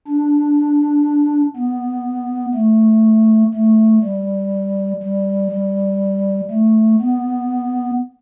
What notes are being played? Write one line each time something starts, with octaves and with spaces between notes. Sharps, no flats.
D4
B3
A3
A3
G3
G3
G3
A3
B3